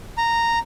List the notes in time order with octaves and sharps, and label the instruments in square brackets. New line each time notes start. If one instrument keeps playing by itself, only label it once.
[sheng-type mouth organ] A#5